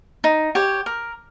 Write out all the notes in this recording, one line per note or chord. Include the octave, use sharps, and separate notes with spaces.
D#4
G4 C#5
A#4